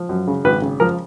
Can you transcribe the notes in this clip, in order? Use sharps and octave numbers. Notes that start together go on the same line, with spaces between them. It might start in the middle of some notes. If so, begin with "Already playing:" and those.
Already playing: F3
F#2
C#3
G#1 B4
C#3
F3 A#4